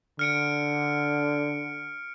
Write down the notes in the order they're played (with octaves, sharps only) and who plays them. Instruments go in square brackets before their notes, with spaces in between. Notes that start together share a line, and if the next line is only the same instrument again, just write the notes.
[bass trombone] D3 [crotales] F6 C#7 D7